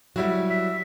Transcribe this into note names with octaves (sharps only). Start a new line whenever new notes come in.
F#3 G3 E4 F#4
E5